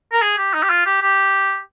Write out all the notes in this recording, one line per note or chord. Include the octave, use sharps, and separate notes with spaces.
A#4
G#4
G4
D#4
G4
F4
G4
G4